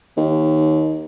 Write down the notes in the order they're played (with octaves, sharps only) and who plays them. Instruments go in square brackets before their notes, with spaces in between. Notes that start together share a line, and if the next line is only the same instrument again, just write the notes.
[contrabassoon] D#2